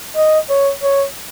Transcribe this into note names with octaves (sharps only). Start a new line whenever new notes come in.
D#5
C#5
C#5